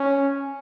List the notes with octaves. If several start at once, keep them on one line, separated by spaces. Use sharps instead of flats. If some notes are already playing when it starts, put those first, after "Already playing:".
Already playing: C#4